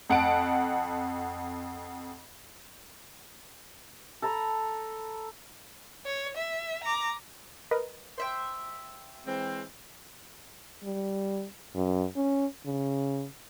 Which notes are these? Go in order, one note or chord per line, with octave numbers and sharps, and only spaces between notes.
F2 F#5 A5 D7
A4 A#5 B5
C#5
E5
A#5 D6
A#4 B4 D#5
C5 E5 G5
E3 G#3 C4
G3
F#2
C#4
C#3